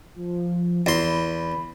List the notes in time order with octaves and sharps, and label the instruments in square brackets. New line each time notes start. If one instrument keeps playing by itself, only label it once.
[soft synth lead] F3
[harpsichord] E2 C6 [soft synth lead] B5